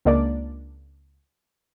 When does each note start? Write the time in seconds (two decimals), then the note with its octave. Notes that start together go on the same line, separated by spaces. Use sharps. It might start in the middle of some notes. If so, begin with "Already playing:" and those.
0.05 C#2 G#3 A#3 D4 D5